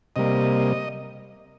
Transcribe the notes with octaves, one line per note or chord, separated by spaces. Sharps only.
C3 G3 A#3 D#5